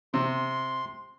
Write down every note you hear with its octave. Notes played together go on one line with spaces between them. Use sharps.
C3 C6